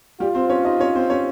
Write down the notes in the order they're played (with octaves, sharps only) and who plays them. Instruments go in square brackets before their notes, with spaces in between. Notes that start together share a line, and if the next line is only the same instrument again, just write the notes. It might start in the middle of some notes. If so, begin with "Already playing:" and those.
[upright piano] G3 G4 [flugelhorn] F4
[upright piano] C4 C5
C#4 C#5
D#4 D#5
C#4 C#5
C4 C5
C#4 C#5